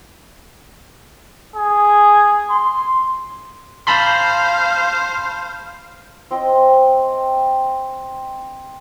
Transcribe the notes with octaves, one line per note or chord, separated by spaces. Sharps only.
G#4
C6
C5 F5 A5 B5 C6
C4 D#5 G5